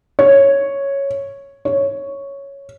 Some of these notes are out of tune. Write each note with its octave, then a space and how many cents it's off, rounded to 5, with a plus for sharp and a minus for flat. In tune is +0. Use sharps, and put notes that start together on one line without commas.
C#5 -5
C#5 +0